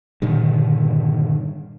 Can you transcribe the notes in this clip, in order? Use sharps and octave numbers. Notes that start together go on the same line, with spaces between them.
G2 A#2 D3 D#3